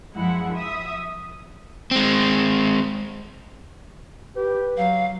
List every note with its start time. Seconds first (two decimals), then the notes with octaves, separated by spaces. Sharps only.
0.14 F#2 F3 G#3 E4 F#5
0.54 E5 D#6
1.91 G#3 C4
4.36 G4 B4
4.77 F#3 F5